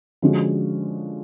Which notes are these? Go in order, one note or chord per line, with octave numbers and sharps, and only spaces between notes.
D3 F3 G#3 C#4 F#4